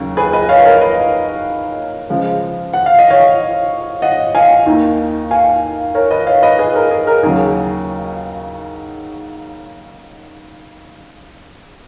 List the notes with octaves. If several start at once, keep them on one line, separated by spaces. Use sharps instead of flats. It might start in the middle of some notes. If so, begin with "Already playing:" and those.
Already playing: D#2 C#3 F#3
G#4 B4
B4 D#5
C#5 F5
A#4 C#5
B4 D#5
C#3 F3 G#3
F#5
F5
D#5
C#5 F5
D#5 F#5
F5 G#5
D#2 D#3 A#3 D#4
F5 G#5
A#4 C#5
B4 D#5
C#5 F5
B4 D#5
G#4 B4
A#4
G#4
A#4
D#2 C#3 F#3 G#4